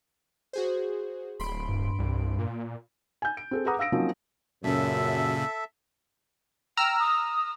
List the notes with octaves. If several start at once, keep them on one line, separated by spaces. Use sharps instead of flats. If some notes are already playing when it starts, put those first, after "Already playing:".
F#4 G#4 C5
D1 B5 C6 D7
G2
C2
A#2
G#5 G6
D7
C4 G#4 A4
G#4 B4 F#5 A#5 D6 D#6
F5 E6 A#6 D7
F3 F#3 A#3 C4 C#4 D#4
F#2 A#2 C#3 A4 E5
G5 A#5 E6 F6
D#6